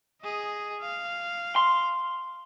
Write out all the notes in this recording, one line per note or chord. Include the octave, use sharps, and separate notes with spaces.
G#4 D#5
F5
C6